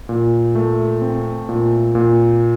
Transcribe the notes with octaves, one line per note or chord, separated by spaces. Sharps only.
A#2
A3
C4
A#2
A#2